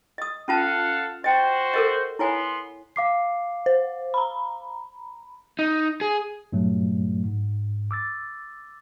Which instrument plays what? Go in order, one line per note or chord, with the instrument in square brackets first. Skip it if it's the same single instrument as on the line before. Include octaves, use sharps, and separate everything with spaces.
[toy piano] D#5 D#6
[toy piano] C#4 F4 A5 [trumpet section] A4 F5 F#5
[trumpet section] F#4 C5 [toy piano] D#5 G5
[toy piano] A4 A#4 D#5
[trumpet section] B3 C6 [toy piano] E4 C#5 G#5
[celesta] F5 D6 C7
[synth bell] C5
A#5 B5
[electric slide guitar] D#4
G#4
[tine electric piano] G2 A#2 F#3 A3
G#2
D6 E6 A6